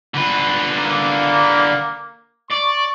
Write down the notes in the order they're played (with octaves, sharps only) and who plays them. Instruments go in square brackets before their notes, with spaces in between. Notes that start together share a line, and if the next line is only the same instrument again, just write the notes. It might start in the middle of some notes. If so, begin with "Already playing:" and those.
[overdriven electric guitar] D3 B4
[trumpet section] A#3
[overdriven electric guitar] D5 [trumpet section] C#6